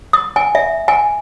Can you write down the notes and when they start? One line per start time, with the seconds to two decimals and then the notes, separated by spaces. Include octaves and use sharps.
0.13 D#6
0.36 G#5
0.55 E5
0.88 G#5